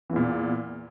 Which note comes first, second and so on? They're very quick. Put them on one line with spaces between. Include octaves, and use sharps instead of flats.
E3 E2 A#2